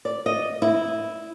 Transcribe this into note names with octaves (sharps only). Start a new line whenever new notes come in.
D5
D#5
E4